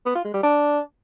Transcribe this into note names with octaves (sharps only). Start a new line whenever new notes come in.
B3
F4
G#3
G3
D4